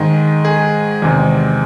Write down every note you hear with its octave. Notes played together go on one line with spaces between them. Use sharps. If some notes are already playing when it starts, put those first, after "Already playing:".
Already playing: G#2 D#3 G#3
G#4
E2 C3 D#3 G#3